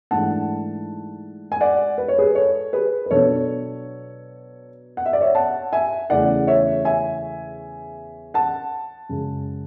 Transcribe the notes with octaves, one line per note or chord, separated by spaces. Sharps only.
G#2 E3 A3 D4 F#5 A5
G#5
D5 F#5
B4
C#5
G#4 B4
A4 C#5
G#4 B4
B4
B2 F#3 B3 D4 A4 C#5
F#5
E5
D5
C#5 E5
F#5 A5
E5 G#5
E2 C#3 E3 A3 C#4 D5 F#5
C#5 E5
E5 G#5
F#5 A5
F#2 C#3 G#3